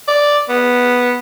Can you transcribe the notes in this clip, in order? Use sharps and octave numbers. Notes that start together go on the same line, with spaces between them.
D5
B3